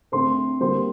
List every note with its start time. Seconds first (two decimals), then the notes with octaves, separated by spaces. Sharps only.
0.12 D3 A3 C4 C5 C6
0.60 D3 G3 A#3 C5 C6